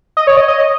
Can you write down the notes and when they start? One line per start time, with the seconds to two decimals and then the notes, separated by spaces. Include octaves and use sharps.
0.17 D#5
0.27 C#5
0.37 D#5
0.48 D#5
0.58 D#5